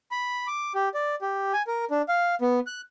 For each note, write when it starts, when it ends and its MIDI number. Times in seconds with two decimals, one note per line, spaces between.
0.11 0.47 83
0.47 0.73 86
0.75 0.89 67
0.94 1.15 74
1.22 1.52 67
1.53 1.62 80
1.67 1.85 70
1.91 2.02 62
2.09 2.35 77
2.41 2.60 59
2.67 2.81 90